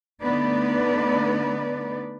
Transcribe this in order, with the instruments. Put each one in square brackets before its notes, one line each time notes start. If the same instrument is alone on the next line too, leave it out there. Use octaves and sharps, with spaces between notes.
[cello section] D3 A3 B3 D#4 B4 D5